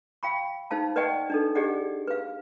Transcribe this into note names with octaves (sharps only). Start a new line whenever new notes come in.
F5 G5 B5 C#6
D#4 C5 F5 A5
B4 D5 D#5 F#5 G5 C#6
D4 D#4 A4
G4 G#4 D5 D#5 F#5
B4 F5